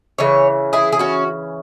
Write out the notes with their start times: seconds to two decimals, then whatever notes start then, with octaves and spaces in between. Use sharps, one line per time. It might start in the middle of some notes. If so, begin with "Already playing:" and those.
0.18 C#3 E3 C#5
0.73 E4 G#4
0.92 G#4
0.99 C#4 F#4